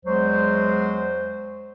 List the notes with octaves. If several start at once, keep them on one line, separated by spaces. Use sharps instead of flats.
E2 F#3 G#3 C5